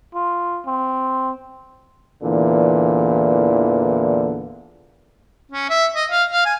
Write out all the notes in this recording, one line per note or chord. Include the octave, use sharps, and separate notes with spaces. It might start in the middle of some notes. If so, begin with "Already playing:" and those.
F4
C4
E2 A#2 D3 E3
C#4
E5
D#5
F5
F5
G#5